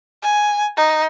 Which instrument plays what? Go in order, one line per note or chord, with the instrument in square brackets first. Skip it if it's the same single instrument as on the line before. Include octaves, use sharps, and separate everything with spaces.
[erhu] G#5
D#4